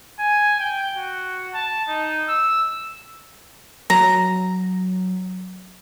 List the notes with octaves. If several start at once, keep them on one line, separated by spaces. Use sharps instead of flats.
G#5
G5
F#4
A5
D#4
E6
F#3 A#5